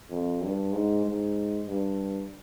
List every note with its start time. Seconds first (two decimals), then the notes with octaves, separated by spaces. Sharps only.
0.10 F2
0.41 G2
0.73 G#2
1.05 G#2
1.66 G2